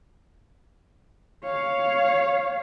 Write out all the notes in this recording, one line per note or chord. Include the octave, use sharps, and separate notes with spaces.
C#5 F5